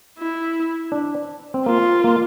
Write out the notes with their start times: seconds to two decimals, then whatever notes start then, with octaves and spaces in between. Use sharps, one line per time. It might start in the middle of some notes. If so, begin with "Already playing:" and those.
0.18 E4
0.92 D4
1.54 C4
1.66 A#3 F4
2.04 A#3